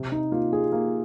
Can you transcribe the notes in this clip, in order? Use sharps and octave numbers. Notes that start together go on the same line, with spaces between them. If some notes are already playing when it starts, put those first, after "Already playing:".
Already playing: C3
D#4
A#3 F4
G#4
A#3